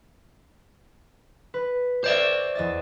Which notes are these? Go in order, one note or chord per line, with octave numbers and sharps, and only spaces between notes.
B4
C5 D5 E5
E2 D#5 A6